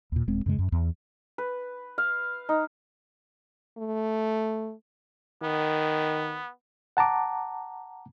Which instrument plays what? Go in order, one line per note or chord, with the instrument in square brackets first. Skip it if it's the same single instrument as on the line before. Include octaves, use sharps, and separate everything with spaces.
[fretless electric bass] D#2 A#2
D#1 G#3 C4
F#2 C#3 G#3
F#2
E2
[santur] B4
F5
D#4
[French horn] A3
[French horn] D#3 [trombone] B3
[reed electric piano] F#5 A5 A#5 D6